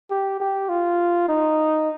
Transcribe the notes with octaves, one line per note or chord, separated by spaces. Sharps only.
G4
G4
F4
D#4